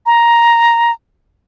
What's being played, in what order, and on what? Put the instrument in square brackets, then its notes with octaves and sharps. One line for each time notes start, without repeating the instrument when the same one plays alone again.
[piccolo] A#5